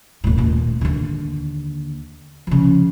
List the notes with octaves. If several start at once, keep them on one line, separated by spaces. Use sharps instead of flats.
D#1 A2
D#2 A#2
D#2 D3
C#3 F3